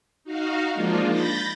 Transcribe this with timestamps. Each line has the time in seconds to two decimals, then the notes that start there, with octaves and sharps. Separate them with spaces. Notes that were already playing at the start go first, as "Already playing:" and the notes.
0.24 D#4 F#4 F5
0.72 F3 G#3 A#3 D4 D#4 F4
1.09 B5 G6 A6 A#6